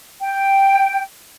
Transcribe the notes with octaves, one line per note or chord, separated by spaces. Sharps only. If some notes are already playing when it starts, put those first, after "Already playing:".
G5